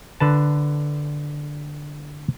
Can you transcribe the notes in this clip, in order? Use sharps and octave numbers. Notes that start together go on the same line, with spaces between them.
D3 B4 A5